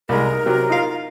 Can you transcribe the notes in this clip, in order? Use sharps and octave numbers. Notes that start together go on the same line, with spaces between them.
C2 G#3 A#4
D#4
C3 F#3
D#4 F4 F5